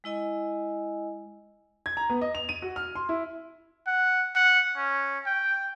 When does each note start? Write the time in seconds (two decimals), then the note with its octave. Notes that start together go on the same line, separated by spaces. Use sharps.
0.04 G#3 E4 D#5 G#5
1.86 G#6
1.97 A#5
2.10 B3
2.21 D#5
2.35 F7
2.49 D#7
2.62 F#4
2.76 F6
2.95 C6
3.09 E4
3.87 F#5
4.35 F#5
4.77 C#4
5.26 G5